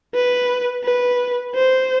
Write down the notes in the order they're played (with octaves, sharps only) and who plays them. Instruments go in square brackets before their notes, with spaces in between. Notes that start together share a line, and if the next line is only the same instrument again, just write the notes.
[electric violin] B4
B4
C5